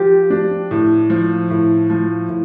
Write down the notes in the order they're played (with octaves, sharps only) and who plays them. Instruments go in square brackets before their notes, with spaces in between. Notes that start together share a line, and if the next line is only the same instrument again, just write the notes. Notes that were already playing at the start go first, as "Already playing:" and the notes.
Already playing: [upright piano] F3 [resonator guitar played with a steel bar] G4
[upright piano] D4
A2
F3
A2
F3
A2